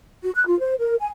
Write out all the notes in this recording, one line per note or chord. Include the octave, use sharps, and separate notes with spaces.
F#4
F#6
F4
C5
A#4
G#5